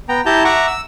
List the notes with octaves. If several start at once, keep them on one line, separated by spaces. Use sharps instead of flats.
B3 G5 A#5
E4 G4 A5 A#5 G6
E5 F#5 A#5 C#6 D6
E6